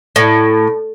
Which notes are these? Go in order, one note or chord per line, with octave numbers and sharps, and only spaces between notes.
A2